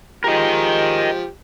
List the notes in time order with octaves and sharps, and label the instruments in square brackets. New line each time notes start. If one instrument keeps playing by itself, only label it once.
[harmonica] F3 G#3 G4 [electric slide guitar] A#4 D#5